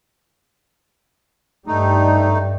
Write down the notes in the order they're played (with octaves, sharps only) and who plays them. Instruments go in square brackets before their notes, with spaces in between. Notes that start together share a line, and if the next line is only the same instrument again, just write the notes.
[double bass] G2 G3 [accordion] A3 D#4